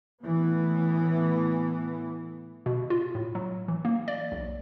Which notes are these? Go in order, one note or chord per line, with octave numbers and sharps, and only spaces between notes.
A2 E3 B3
B2
F4
A2
F#3
E3
A#3
D5
B1